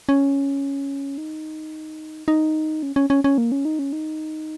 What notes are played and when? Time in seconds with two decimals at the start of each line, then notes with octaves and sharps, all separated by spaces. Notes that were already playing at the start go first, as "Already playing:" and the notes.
0.09 C#4
1.18 D#4
2.28 D#4
2.83 C#4
2.96 C#4
3.10 C#4
3.24 C#4
3.38 A#3
3.52 C#4
3.65 D#4
3.79 C#4
3.93 D#4